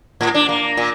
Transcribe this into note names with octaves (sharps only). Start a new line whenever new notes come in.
A2
D4
A#3
A#2